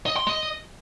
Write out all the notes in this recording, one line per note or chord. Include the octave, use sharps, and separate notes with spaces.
D#5
C6
D#5